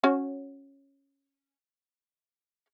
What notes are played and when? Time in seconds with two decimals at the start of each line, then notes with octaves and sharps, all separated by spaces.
0.04 C#4 F#4 C#5